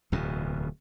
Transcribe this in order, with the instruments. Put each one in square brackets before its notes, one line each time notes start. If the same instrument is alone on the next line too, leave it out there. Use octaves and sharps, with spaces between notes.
[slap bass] D1 E2 B2